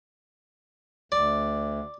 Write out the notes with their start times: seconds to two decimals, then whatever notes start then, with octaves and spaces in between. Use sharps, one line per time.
1.12 D2 D5